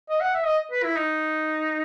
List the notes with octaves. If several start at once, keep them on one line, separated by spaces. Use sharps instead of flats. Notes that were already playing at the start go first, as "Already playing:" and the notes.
D#5
F#5
E5
D#5
B4
E4
D#4